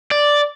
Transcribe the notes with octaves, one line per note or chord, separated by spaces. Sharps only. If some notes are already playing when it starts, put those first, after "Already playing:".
D5